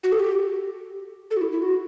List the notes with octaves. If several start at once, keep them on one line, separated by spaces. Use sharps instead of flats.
F#4
A4
G4
A4
F#4
E4
E4
F#4